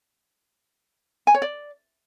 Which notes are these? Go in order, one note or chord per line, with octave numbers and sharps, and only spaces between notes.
G#5
C#5
D5